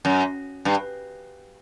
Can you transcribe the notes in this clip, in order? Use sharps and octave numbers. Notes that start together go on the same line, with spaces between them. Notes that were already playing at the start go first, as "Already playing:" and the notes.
F#2
G2